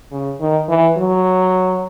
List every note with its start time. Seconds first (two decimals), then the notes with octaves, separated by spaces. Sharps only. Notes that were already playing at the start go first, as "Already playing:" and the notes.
0.12 C#3
0.40 D#3
0.69 E3
0.98 F#3